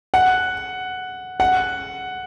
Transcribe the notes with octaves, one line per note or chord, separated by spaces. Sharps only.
F#5
F#5